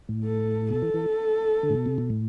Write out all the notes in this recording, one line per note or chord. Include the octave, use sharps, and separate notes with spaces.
A2
A4
B2 A4
E3
E3
D3
A2
B2
C3
B2
A2